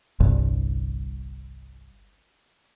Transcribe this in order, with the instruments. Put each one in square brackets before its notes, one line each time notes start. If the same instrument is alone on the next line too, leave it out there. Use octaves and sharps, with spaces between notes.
[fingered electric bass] G1 C2 G2